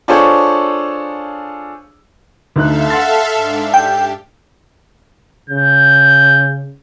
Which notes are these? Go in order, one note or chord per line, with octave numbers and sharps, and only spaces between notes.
D4 F4 G#4 A4 C5 C#5
D2 D#4 A4 E5 F5 F#6
F#5 C6 A6
G#2 D4
G4 G5
C#3 G6